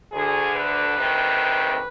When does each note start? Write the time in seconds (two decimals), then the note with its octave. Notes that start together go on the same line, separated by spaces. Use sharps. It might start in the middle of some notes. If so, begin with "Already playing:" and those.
0.12 D2 D3 G#4
0.55 B4
0.96 D2 C3 D#3